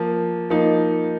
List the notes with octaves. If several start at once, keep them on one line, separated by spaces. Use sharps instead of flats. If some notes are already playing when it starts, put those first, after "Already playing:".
Already playing: F3 A#3
F3 A#3 D#4